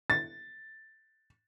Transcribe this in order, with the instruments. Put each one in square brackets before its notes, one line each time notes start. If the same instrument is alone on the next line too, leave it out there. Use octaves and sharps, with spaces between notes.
[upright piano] A6